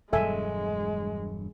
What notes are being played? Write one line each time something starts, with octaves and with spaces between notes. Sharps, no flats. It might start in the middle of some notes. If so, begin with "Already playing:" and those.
E1 G2 F#3 G#3 A4 E5 G#5